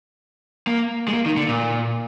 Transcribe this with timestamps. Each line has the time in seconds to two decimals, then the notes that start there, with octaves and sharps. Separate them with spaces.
0.67 A#3
1.08 G#3
1.14 A#3
1.26 D#3
1.37 D3
1.48 A#2